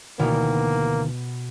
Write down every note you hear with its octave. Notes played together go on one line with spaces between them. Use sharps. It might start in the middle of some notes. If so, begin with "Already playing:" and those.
D2 B2 D#3 E3 A#3